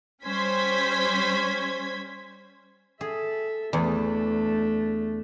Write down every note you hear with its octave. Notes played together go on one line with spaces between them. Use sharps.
G3 C#4 C5 G#6 B6
G#4 A4 E5
E2 A3 D4 G#4